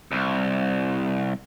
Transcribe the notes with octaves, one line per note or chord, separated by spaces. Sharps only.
C2